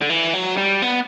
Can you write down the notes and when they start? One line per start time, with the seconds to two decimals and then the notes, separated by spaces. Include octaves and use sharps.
0.01 D3
0.10 E3
0.34 F#3
0.57 G3
0.82 B3